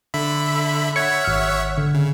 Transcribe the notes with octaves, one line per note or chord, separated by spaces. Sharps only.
D3 E5 B5
C#5 E5 F#5 G#6 C#7
G#1 F6
D3
C#3